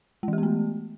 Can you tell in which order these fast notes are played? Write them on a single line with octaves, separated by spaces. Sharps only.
G#3 E3 G4 B3 A3